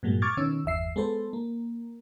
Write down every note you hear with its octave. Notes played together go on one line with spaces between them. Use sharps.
G2 A#2 F#3 G#3
C#6 D6 F6 G#6 A6
B2 D#3 C#4 E6
G1 E2 E5 C7
G#3 B3 A4 C5
A#3